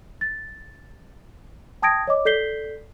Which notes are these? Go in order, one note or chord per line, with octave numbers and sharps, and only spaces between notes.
A6
G5 A5 D#6 G#6 A#6 D7
C#5 D#5 D6
A4 D5 G6 B6 C7 G7